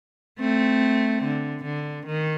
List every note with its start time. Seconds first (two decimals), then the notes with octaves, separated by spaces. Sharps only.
0.40 A3 C4
1.23 D3
1.64 D3
2.06 D#3